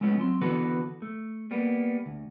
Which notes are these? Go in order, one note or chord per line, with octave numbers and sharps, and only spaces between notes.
G#3 A3 B3 C#4 F4
F#3 C4 C6
D3 E3 B3 F#4 A4 B4
A3
G3 A#3 B3
D2